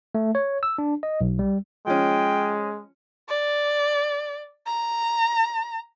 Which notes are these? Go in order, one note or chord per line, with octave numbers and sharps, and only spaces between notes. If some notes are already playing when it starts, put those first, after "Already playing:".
A3
C#5
E6
D4
D#5
B1
G3
F3 G#3 C#4 G5
D5
A#5